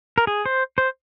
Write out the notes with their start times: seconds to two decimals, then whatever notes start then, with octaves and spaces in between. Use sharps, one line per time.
0.18 A#4
0.27 G#4
0.46 C5
0.78 C5